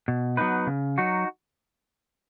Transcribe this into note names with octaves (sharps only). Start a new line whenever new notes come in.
B2
F#3 B3 D#4 B4
C#3
F#3 D#4 F#4